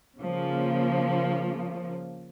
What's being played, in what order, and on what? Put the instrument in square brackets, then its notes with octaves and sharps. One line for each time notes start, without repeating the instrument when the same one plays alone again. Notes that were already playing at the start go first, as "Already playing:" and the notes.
[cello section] C#3 F3 A#3